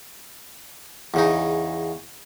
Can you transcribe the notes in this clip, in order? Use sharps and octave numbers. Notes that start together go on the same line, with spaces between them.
E2 C#3 D#4